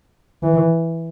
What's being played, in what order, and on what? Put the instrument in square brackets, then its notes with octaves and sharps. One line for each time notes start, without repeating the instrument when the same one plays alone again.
[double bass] E3